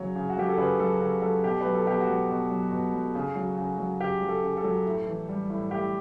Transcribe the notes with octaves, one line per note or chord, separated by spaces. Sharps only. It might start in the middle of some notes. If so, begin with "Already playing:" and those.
Already playing: C#3 F#3 C#5
C#3
F#4
F#3 G4
A4
C#3 B4
F#3 A4
C#3 A4
F#3 A4
B2 G4
F#3 B4
A4
B2 G4
F#4
F#3
B2
F#3
B2
F#3
C#3
F#3
C#3
F#3
C#3 G4
F#3
A4
C#3
A4
F#3
A2
E3
G3
A2
A2 G4